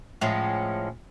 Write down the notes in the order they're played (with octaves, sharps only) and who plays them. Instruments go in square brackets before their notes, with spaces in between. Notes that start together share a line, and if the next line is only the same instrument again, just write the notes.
[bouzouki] A2 F3 G#3 C#4